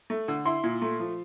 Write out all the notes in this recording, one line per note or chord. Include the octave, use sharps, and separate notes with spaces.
A3
D3
E4 C6
A#2
A3
F3